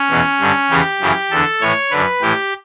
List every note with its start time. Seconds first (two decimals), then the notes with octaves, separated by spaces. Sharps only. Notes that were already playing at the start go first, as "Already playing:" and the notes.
Already playing: C#4
0.10 E2 B2
0.40 G2 D3
0.70 E2 C#3 E3 G4
1.01 F#2 C#3 E3
1.31 E2 D3 A4
1.61 A2 E3 C#5
1.91 F#2 D3 B4
2.22 A2 E3 G4